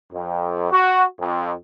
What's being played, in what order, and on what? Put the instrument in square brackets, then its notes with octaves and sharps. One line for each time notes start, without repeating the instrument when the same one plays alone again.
[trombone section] F2
F#4
F2